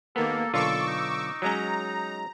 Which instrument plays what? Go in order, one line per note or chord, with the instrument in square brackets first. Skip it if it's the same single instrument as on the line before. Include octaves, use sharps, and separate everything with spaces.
[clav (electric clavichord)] D#2 B3 [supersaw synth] A#3 [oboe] A4
[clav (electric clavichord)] B1 D3 F4 [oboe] A4 [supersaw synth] C#6 D6 E6
[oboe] D#4
[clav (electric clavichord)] F#3 G#3 C#4 [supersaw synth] A#5